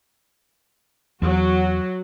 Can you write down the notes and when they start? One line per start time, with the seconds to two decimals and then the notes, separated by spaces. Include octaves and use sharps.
1.22 E2 F#3 F#4